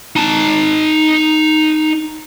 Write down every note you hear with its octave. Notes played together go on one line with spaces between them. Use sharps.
D#4 A5